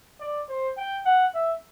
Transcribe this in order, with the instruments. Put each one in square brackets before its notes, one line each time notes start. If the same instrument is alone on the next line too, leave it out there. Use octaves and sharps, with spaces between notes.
[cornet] D5
C5
G5
F#5
E5